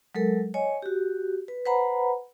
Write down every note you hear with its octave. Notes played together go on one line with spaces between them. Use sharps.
F#3 G#3 A4 A#4
C#5 D#5 G#5
F#4 G4
B4
B4 C5 F#5 A#5 B5